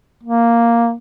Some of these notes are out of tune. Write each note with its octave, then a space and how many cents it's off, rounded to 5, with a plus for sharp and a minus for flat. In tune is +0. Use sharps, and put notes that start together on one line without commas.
A#3 +0